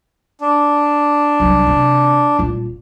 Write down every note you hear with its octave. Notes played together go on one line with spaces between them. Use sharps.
D4
C2 F#3
C3
D#1 F4